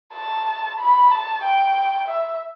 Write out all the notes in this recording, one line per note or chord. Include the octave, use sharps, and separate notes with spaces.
A5
B5
A5
G5
E5